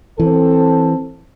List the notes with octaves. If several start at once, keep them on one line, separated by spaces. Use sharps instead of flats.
E3 C4 A4